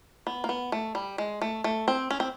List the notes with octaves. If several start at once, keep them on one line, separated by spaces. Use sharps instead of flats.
B3
A#3
B3
A3
G3
G#3
A3
A3
C4
C#4
C4